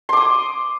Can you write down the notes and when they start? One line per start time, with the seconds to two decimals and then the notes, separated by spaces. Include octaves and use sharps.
0.09 C6
0.13 D6
0.17 D#6